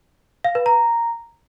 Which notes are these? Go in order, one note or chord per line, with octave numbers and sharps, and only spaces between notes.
F5
B4
A#5